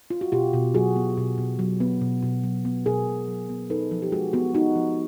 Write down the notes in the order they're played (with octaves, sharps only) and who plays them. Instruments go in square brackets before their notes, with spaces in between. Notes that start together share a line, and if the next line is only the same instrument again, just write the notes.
[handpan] F4
F#4
B2 F4 G4
B2
F#3 F#4 G#4
B3
B2
B2
F#3
B3
B2
B2
F#3
B3
B2 G#4 A#4
B2
F#3
B3
D#4 A4 B4
F3
G4
G#3 F#4 G#4
B3 F#4
D#4 F#4
F3